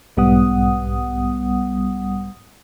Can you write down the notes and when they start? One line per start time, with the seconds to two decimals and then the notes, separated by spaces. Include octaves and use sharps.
0.17 B1 G#2 G3 B3 F#5 D#6